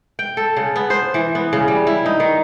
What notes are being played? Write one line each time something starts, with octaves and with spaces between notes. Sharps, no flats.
G5
A4
C#3
B3
C5
E3
B3
C#3
G3
E4
D#4
D#3